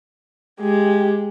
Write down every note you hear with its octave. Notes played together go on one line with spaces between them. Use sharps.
G#3 G4